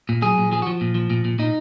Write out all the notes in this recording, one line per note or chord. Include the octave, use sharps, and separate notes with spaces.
A#2
F#3 G#4
A#2
F3 G#4
F#4
F3
A#2
F3
A#2
A#2
A#2 D#4